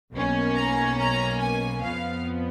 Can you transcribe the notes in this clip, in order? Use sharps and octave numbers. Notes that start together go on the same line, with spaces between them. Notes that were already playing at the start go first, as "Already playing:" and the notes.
B1 B2 A#3 C#4
A#5
A#5
G#5
F2 F3 B3 F5